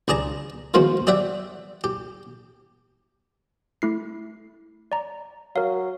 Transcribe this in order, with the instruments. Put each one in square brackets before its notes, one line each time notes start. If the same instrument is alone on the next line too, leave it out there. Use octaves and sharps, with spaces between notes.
[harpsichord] C#2 D4 G#4 A5 A#5
D#3 F3 G#3 B3 F4 F#4
G4 D5 E5 F#5 G5
G4
[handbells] A3 E4 C7
D5 A#5
[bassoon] F#3 [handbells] A#4 F5